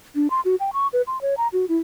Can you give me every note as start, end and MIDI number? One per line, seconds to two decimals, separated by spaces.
0.15 0.28 62
0.30 0.41 84
0.45 0.55 66
0.60 0.70 79
0.73 0.88 85
0.93 1.02 71
1.07 1.21 84
1.22 1.34 73
1.37 1.48 82
1.53 1.65 66
1.69 1.78 64